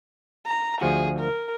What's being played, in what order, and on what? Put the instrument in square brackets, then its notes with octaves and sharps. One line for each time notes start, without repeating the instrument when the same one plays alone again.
[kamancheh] A#5
[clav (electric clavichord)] D2 F3 F#4 [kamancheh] G#4
[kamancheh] A#4